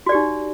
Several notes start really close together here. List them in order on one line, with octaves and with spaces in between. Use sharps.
F#4 D5 G4 D#4